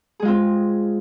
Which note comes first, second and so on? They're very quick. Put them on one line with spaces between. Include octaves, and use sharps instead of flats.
G#4 G#3 F4 C4